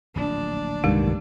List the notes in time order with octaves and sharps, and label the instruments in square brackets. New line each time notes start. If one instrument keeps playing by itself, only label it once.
[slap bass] D1 A#1 [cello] D4
[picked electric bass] C2 G2 D#3 [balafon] G#3